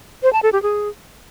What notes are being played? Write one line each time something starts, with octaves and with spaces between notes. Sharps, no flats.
C5
A5
A4
G4
G#4